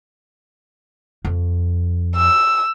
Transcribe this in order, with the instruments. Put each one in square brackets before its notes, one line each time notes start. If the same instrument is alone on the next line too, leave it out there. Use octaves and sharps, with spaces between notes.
[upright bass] F2
[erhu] E6